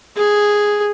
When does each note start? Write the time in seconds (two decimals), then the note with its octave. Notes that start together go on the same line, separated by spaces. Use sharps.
0.17 G#4